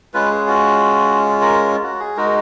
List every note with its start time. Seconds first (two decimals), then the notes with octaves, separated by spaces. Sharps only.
0.14 G#3 C#4 F4 B4
0.31 G#4
0.47 F#4
1.41 A#4
1.83 F#4
2.00 G#4
2.17 G#3 D#4 F#4 A#4